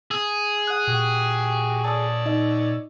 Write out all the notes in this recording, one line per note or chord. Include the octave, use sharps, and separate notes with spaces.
G#4 E6
F#5 D#6 F#6
A#2 F#4 G4
C#5 D5 A5 D#6 E6
D#4 D#5